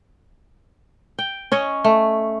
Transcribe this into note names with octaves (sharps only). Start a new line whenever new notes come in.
G5
C#4 C#5 D#5
A3